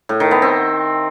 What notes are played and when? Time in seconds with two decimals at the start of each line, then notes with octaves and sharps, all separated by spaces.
0.09 A2
0.20 D#3
0.31 B3
0.42 C4